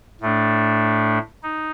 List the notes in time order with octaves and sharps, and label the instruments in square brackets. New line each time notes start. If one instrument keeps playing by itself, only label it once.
[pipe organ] A2 A3 D4
D#4